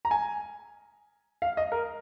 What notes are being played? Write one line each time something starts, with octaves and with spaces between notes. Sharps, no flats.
A#5
G#5
F5
D#5
A#4